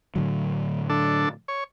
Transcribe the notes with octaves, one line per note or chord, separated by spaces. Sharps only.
A2 D3 F#3
D4 A4
C#5